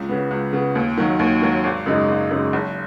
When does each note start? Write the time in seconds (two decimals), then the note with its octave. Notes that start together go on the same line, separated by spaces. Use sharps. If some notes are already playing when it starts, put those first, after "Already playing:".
Already playing: C#2
0.09 C#3 B3
0.31 C#2
0.53 C#3 B3
0.75 D#2
0.98 D#3 F#3
1.19 D#2
1.42 D#3 F#3
1.64 G#1
1.86 F#2 C#3 G#3 D#4
2.08 G#1
2.31 F#2 C#3 G#3 D#4
2.53 F#1